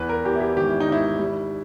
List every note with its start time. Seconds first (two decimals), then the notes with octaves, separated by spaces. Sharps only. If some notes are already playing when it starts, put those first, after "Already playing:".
Already playing: E2 B4
0.09 A#4
0.24 E2 G4
0.35 E4
0.41 G4
0.56 G#1 G4
0.69 E4
0.80 D#4
0.88 G#1 E4
1.19 G3